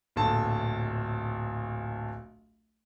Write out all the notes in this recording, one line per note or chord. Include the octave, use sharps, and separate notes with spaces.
D1 A#1 A4 A5